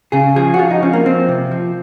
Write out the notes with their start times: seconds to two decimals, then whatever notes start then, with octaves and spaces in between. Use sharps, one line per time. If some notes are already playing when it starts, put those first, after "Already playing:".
0.12 C#3 G#4
0.36 F3 G#4
0.54 F#4
0.59 F3 F4
0.71 D#4
0.83 F3 C#4
0.93 A#3
1.05 F3 C4
1.28 C3
1.51 F3